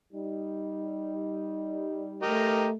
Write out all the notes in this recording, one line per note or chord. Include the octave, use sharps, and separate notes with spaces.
G3 D#4
A3 G4 A#4 D#5